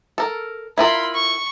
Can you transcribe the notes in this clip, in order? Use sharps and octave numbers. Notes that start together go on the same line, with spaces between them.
A4 A#4
E4 F4 A#4 B5 C6
C#6